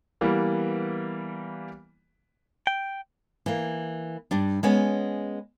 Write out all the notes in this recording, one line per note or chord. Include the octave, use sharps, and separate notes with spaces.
E3 G3 A#3 B3
G5
E3 A#3
G2 G3 D4
G#3 B3 C#4